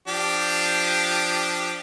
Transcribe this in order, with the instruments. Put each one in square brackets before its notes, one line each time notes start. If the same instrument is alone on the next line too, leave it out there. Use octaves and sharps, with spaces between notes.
[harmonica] F3 D4 G4